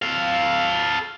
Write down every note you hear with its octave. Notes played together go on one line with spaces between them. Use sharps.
A4 F5